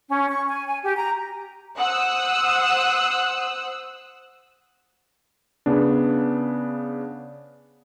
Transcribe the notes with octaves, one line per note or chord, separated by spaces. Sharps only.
C#4
C#6
G#5
G#5
G4
A#5
C5 F#5 D#6 E6 F#6
C#3 B3 D4